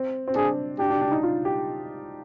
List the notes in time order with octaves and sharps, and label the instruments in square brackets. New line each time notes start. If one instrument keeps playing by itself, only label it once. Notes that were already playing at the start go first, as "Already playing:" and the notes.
Already playing: [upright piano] C4
C4
[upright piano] D4 [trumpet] G#4
[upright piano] D4 [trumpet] G4
[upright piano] D4
D4
D#4
F4
G4